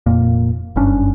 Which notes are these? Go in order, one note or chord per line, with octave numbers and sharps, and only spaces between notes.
F1 F2 A#2 A#3
F#1 G2 C#4 D4